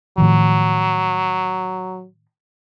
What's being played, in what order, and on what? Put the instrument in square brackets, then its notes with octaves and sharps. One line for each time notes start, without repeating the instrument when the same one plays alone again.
[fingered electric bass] A2 D#3 F3 [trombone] F#3